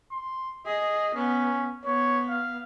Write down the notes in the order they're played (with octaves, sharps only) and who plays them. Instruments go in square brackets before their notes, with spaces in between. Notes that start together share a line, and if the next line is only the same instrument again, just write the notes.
[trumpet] C6
[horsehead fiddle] G#4 [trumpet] D#5
[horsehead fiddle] B3 [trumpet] C#4
[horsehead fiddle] B3 [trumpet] C#5
[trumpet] F5